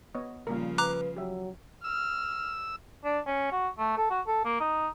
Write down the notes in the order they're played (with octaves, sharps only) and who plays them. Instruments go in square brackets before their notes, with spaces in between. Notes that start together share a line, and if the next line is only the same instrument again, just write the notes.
[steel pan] B3 C#5 D#5
[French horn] A#2 [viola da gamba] C#3 F3 [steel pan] G3 A#3 A#4
[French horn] B4 [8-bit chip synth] A#5 D6 F#6
[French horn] F#3 [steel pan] G4 E5
[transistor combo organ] E6 [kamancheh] F6
[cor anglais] D4
C#4
F#4
A3
A4
F#4
A4
A#3
D#4